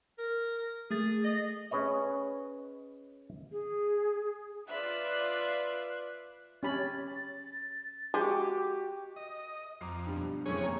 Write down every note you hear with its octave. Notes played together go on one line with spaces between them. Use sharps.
A#4
A3 G#4 A6
D#5
C#4 G#4 B4 C#5 D#5
G#4
F4 B4 D5 E5 F#6 C7
C#4 G4 B5 A6
G#3 F#4 G4 D6
D#5
F2 A#5 D6 C7
G2 B2 G3
F#1 F2 E3 C#4 G#4 C#5
D#1 A#2 A#5